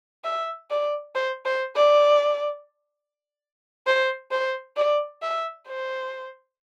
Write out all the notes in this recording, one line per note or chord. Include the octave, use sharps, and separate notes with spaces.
E5
D5
C5
C5
D5
C5
C5
D5
E5
C5